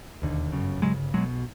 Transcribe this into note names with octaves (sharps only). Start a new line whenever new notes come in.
E1 D#2 D3
G1 F#2 C#3
G1 F#2 C#3 F#3 G#3
B1 B2 F#3 G#3